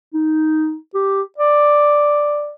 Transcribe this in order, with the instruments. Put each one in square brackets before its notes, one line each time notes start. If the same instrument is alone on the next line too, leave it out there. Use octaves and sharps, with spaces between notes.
[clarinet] D#4
G4
D5